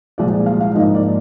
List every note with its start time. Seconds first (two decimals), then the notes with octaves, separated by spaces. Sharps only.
0.18 C2 A#2 F3 G#3 D5
0.46 F5
0.61 F5
0.75 G#2 F3 A#3 D#4 D#5
0.94 D5